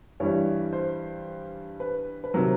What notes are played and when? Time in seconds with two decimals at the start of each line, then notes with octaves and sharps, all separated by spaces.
0.20 G2 E3 G3 C#5
0.73 C5
1.80 B4
2.24 B4
2.34 C3 D#3 F#3 A#4